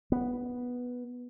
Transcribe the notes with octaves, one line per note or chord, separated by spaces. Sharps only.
B3